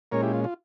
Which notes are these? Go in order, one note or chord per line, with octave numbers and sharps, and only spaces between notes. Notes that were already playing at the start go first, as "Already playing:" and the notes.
A#2 G#3 C#4 A#4 C#5
E4 G4
F4
F4